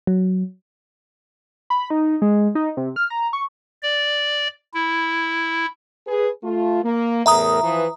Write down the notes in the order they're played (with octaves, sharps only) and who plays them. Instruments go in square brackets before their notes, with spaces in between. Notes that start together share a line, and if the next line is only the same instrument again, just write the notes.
[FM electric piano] F#3
[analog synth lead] B5
D#4
G#3
D#4
C3
F6
A#5
C#6
[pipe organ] D5
E4
[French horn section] G#4 B4
A3 F4
A#3
[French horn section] E2 A2 A#4 [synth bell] E5 A#5 D#6
[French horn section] E3 F3 B4